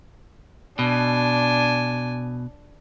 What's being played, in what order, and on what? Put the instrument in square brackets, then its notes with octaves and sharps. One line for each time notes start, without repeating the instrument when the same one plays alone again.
[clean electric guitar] B2 [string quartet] D4 G#5